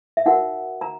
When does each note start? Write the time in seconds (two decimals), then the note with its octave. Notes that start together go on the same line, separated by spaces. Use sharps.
0.17 E5
0.26 D#4 F#4 A#4 F#5
0.81 A#5